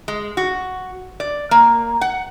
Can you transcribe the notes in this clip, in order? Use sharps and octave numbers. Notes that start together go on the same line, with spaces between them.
G#3
F#4
D5
A#3
F#5